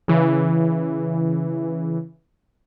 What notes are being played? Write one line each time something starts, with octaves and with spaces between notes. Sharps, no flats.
C#3 E3